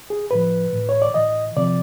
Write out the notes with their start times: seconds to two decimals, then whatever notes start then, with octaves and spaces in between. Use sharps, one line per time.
0.10 G#4
0.31 A2 F3 B4
0.73 A2 E3
0.89 C#5
1.02 D5
1.14 A2 E3 D#5
1.57 C3 F3 D5